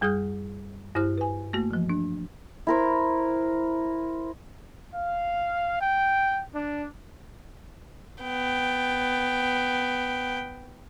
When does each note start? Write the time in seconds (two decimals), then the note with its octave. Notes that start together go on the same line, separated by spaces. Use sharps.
0.01 F#2 G3 G#4 D#6 F6 G6
0.95 G2 E4 G4 C5 F6
1.18 B4 G#5
1.53 A3 A#3 F#4
1.71 E3 F3
1.89 D4
2.67 E4 A#4 C5
4.93 F5
5.80 G5
6.54 D4
8.22 B3 G5